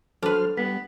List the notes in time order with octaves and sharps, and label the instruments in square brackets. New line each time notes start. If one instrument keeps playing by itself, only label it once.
[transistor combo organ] F#3 C5 F6 [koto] D4 B4 [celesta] A4
[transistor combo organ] G3 [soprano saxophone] B3 [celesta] B6